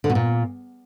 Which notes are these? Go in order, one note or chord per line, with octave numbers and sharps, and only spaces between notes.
D3
B2
A#2